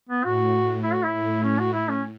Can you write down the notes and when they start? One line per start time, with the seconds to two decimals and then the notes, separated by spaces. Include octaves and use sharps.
0.09 B3
0.24 A2 F#4
0.84 E4
0.93 F#4
1.03 E4
1.14 A2
1.44 C#4
1.59 F#4
1.74 E4
1.89 C#4